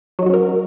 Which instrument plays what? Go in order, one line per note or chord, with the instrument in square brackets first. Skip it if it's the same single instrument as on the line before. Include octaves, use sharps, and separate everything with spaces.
[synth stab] F#3
D#4
F#4
C#4
A#4